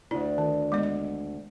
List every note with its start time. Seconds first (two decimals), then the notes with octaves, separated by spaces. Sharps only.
0.11 D2 D4 E4
0.38 D#3
0.72 G#3 B3 D#5
0.83 D#5